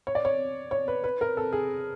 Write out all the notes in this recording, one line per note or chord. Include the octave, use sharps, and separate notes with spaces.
C#5
D5
C#5
C#5
B4
B4
A#4
A4
G#4